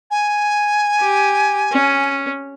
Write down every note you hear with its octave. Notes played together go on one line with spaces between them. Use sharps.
G#5
G4
C#4